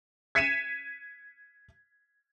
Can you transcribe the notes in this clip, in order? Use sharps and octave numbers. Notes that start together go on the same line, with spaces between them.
G#6 B6 C#7 D#7 E7